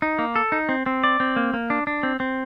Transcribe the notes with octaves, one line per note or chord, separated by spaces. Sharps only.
D#4
A#3
A4
D#4
C4
C4
D5
C4
A#3
A#3
D4
D4
C4
C4